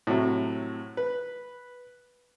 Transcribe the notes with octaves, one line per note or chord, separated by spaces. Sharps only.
A2 C3 F#3
B4